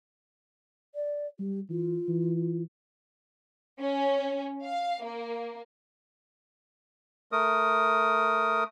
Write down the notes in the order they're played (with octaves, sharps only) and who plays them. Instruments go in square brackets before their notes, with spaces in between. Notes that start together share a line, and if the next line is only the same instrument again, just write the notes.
[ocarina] D5
[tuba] G3 [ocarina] G4
[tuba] E3 [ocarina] F4
[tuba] E3
[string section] C#4
F5
A#3
[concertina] A3 A#4 D#6